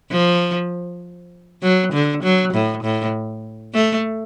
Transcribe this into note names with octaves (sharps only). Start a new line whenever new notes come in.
F3
F#3
D3
F#3
A2
A2
A3